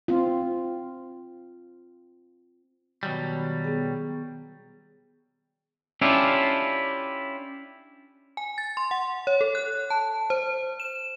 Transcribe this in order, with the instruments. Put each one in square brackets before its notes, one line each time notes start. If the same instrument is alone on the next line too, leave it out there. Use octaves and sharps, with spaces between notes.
[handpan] C4 F4
[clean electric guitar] B2 F#3 G3 [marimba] D#3
[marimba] B3 G#4
[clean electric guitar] C#4 D4 E4 F4 G4 E5
[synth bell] G#5
A6
C6
F#5
C#5
A4
F#6
A5
C5
E7